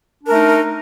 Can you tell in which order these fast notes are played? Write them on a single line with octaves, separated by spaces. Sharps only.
D4 A#4 A3 D#4